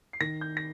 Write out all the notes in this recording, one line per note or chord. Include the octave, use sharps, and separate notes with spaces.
C7
D#3 A#6
G6
A#6